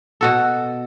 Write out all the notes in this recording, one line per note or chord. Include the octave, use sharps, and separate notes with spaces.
B2 F#4 A4